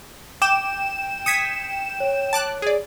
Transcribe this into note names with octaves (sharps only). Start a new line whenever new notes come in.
G5 D6 E7
D#6 G#6 B6 C#7
C#5
A5 D6 F#6
G#4 D5